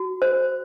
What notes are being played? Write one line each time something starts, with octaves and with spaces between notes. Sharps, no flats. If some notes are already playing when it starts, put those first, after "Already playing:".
Already playing: F#4
C5